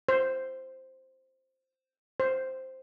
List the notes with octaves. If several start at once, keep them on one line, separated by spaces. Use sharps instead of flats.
C5
C5